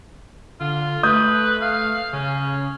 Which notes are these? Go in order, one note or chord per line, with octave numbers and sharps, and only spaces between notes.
D3 F4
A3 B4 D#6 G6
F5
C#3 C#4